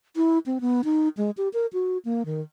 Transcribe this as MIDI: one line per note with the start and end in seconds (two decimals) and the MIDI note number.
0.16 0.39 64
0.46 0.58 60
0.61 0.81 59
0.84 1.08 63
1.17 1.31 56
1.37 1.49 67
1.53 1.66 70
1.73 1.98 66
2.05 2.23 58
2.26 2.41 51